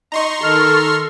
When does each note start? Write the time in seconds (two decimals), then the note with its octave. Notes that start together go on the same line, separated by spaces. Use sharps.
0.12 D#4 A#5 C6 C#6
0.43 D#3 A4 F6